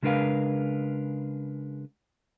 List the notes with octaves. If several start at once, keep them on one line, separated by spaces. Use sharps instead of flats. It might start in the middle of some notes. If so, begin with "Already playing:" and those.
C#3 G#3 D4 A#4 B4 F5